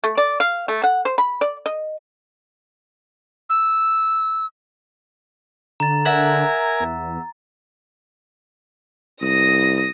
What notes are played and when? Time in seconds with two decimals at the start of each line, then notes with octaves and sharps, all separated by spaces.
0.04 A3
0.17 D5
0.40 F5
0.68 A3
0.83 F#5
1.05 C5
1.18 B5
1.41 D5
1.66 D#5
3.50 E6
5.80 D3 A#5 A6
6.05 A#4 E5 F#5 G#5
6.80 E2
9.22 C2 D#6 A#6